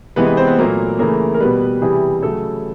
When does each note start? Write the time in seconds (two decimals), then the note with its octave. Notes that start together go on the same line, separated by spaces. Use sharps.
0.16 C3 E3 G#3 B3 B4
0.27 B3 B4
0.37 C4 C5
0.47 B3 B4
0.58 A#2 F#3 A3 A#3 A#4
0.99 C#3 E3 A3 A#3 A#4
1.34 A#4
1.40 B2 G3 B3 B4
1.82 C3 E3 G3 G#4
2.22 C#3 F#3 A3 A4